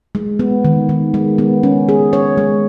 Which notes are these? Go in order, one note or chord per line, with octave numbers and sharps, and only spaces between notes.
G#3
B3
D#3
D#3
G#3
B3
C#4
G#4
C#5
G#3